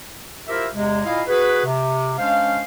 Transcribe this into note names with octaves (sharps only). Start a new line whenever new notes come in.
E4 F4 G4 A#4 C5 E5
E2 C3 G#3
A#2 E4 D#5 F5
F#4 G#4 B4
C3
G#3 C#4 D4 C5 F5